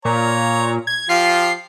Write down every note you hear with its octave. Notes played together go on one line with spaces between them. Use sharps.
A#2 C#5 A#5
G#6
F3 F4 G4 C7